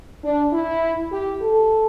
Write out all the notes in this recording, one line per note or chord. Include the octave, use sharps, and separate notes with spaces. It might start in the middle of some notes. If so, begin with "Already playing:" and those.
D4
E4
G4
A4